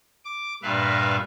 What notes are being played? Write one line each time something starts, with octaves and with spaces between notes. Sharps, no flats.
D6
G2 A#2 B4 E5 F5